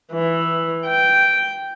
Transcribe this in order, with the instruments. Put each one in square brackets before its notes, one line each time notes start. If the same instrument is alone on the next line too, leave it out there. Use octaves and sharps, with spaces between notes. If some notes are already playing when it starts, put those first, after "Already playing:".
[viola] E3
G5